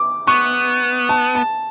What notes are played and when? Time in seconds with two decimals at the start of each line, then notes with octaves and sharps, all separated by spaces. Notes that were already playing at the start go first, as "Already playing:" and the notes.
Already playing: D6
0.27 B3 C#6
1.09 A5
1.35 A5